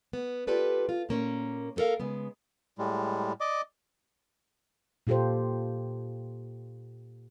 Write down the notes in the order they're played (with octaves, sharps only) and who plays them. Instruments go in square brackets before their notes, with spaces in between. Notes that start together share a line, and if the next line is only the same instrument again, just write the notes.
[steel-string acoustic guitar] B3
F4 G4 A4 B4 D5
F4
A#2 A#3 C#4
A#3 B3 A4 A#4 F5
C#3 G#3 B3
[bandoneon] A2 G3 G#3
D5 D#5 D6
[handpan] A#2 F4 G4 A4 C5